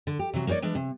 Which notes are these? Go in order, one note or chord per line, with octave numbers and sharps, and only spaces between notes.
D3
G4
C3 E3 F#3
A#3 D#4 G4 C#5 D5
E3 G#3 D4
C3